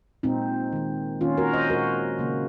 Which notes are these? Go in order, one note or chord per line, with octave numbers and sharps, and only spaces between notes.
A#2 G#3 C4 D#4
D#3 G#3
D#3 A#3 C#4 F4
F#4 A#4
C5 D#5
A#2 G#3 F#4 A#4
C#3 F#3 A#3